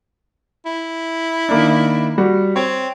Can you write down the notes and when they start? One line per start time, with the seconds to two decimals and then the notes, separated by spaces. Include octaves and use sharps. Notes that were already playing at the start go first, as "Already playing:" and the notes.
0.66 E4
1.49 D#3 A#3 D4
2.18 G3 F#4
2.56 C4 C#5